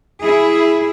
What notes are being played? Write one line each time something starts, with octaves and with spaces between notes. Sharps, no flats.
E4 G#4